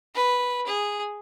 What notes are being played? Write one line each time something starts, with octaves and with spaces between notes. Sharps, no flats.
B4
G#4